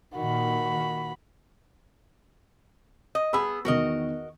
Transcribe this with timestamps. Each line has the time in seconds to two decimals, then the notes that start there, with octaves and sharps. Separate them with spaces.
0.16 A#2 D#3 F#4 B5
3.15 D#5
3.33 B3 G#4 B5 E6
3.65 E2 D#3 F#4 A#4 D#5